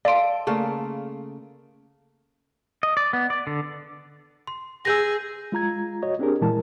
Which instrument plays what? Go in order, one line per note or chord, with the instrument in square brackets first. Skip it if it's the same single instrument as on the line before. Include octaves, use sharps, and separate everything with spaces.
[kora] A4 [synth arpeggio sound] D5 D7 [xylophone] F5 C6
[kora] C#3 A3 A#3
[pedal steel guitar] D#5
D5
B3
D5
D3
[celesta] C6
[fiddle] G#4 [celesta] E6 G6 A#6
[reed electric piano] G#3 F4 A#5 G#6
F#4 C#5 D#5
C4 D4 G4 G#4 A#4
A#2 E3 G#3 E4 A#4 A5